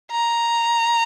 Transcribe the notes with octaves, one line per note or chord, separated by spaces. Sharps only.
A#5